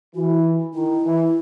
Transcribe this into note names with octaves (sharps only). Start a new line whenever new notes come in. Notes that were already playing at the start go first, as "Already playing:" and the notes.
E3 F#4
E4
D#3 E4
E3